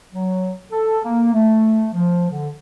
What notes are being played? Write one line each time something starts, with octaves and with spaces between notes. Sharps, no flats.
F#3
A4
A#3
A3
F3
D3